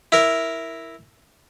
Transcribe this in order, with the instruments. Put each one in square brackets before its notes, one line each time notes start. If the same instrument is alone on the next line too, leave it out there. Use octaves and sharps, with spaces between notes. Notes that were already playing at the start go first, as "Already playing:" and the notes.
[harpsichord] E4 A#4